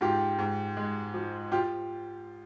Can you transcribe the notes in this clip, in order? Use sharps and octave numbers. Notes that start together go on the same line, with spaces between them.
G#2 F4 G4
G#2
G#3
F3
F4 G4